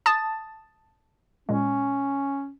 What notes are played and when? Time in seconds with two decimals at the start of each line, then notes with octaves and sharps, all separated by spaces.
0.06 A5 D#6 A6
1.49 A#2 G#3 C#4